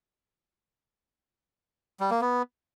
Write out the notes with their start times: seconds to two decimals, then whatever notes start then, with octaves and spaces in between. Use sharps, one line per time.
2.00 G3
2.11 A#3
2.21 B3